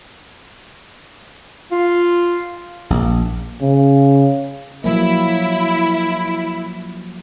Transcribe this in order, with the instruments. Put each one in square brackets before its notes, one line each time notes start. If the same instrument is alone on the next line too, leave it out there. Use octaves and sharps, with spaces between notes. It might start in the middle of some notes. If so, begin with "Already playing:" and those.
[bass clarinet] F4
[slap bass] A#1
[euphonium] C#3
[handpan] F3 F#3 A#3 [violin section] E4